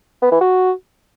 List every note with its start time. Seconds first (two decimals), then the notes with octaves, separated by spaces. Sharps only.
0.22 B3
0.31 E3
0.41 F#4